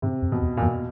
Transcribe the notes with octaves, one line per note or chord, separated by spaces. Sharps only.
G#2 C3
F2
B2
E2
A#2
F2 B2